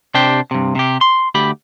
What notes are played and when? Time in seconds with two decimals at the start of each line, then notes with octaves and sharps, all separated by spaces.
0.14 C3 D4 G4 C5 G5
0.51 G2 C3
0.75 C3 G4
1.01 C6
1.35 D2 G4 B5